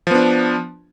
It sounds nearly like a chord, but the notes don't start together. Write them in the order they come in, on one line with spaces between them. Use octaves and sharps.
F3 B3 D4